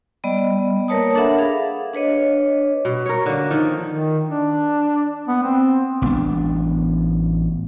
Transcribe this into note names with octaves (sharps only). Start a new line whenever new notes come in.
G3 B3 D5 D#5
A#3 A#4 B4 C#5 A5 D#6
D4 A4 A#4 E5 F#5 B5
G#4 F5
D4 B4 C#5 D#5
B2
A#4 C#5
D3 A#3
D#3 F3
D#3
D4
B3
C4
A1 B3 D4